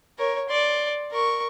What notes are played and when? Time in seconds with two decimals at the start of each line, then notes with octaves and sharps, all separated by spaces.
0.18 A#4 C#5
0.49 D5 C6
1.12 A#4 C#6